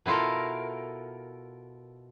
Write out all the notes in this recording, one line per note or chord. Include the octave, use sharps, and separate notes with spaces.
B2 E4 F4 A4 A#4